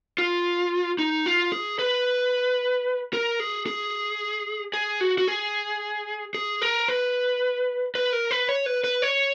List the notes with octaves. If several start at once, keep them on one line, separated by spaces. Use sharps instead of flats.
F4
D#4
F4
G#4
B4
A#4
G#4
G#4
G#4
F#4
F#4
G#4
G#4
A#4
B4
B4
A#4
B4
C#5
B4
B4
C#5